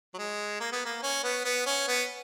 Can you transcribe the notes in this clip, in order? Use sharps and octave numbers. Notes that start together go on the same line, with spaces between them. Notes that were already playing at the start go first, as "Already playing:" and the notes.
F#3
G#3
A#3
B3
A#3
C#4
B3
B3
C#4
B3